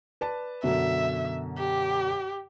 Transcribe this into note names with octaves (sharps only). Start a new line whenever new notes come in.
B4 D5 A5
F#2 B2 D3 E5
G4